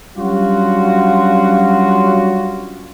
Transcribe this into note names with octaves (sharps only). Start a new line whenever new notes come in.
F#3 G3 C#4 D4 F4 F#4